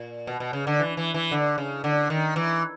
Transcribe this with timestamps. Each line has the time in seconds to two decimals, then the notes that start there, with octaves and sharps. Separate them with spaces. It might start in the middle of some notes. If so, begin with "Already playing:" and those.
Already playing: A#2
0.27 B2
0.40 B2
0.53 C#3
0.67 D3
0.80 E3
0.97 E3
1.14 E3
1.32 D3
1.58 C#3
1.84 D3
2.10 D#3
2.36 E3